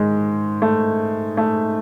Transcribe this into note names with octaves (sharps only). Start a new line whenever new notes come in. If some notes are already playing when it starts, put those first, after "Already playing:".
Already playing: G#2 D#3 G#3
A3
A3